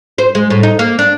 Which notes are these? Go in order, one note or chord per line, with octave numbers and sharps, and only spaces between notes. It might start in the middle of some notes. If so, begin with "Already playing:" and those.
C5
G#3
A2
D#4
A#3
D4